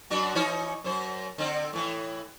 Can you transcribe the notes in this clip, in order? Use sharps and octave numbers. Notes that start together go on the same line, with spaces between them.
F#2 D4 F#4
E3 D#4 C#5
F#2 C5
D3 C4
A2 E3